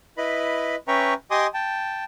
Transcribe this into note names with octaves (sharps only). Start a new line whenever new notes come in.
E4 B4 D#5 B5
C#4 B4 E5 G5 A#5 C#6
G4 D#5 G#5 C6 D6 D#6
G5 A5